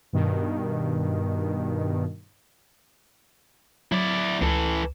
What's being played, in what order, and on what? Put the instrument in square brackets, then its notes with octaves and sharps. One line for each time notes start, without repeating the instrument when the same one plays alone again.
[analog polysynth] G2 B2 D#3
[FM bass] F#3 [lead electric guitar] E4 D5
[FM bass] C#2 [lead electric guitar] E3 A4